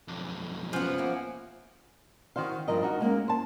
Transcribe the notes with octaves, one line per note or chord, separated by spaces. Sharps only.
B1 F2
F3 B3 C#4 F#5
A#3 E4
D#3 F#4 C5 F5
G2 F3 A#4 D#5
D#4 F#4 A#4
G#3 A#3 C4 C#4
C5 A5